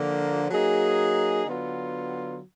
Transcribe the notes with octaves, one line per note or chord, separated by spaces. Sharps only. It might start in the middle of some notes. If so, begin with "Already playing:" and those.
Already playing: D3 F3 A#3
F#3 A#3 D#4 G#4
D3 F#3 B3 F4